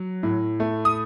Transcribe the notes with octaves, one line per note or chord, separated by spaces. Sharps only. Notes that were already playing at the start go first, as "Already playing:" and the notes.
Already playing: F#3
A2
A3
D#6